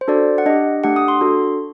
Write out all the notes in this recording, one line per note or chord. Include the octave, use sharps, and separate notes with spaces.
C5
D4 F#4 A4 D5
F#5
D4 G4 D#5
A3 D4 G4 F#5
D#6
C6
D4 F#4 A4